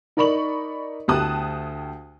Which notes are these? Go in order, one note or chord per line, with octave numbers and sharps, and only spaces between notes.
D#4 A#4 D5 B5 C#6 F#7
D2 G4 A5 D#6 F#6